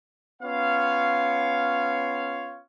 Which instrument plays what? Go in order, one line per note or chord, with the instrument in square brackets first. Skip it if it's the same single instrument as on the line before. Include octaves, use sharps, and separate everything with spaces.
[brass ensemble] B3 C#4 F4 C#5 F5